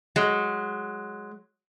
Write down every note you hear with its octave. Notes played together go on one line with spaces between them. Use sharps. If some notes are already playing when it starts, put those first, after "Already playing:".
F#3 G#3